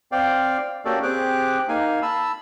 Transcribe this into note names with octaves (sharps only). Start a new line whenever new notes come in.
C4 D5 F5 G5
A#3 C#4 F#4 G4 A4 D5
C4 G4 G#4 D6 F#6
A#3 D#4 F5 G#5
A5 B5 E6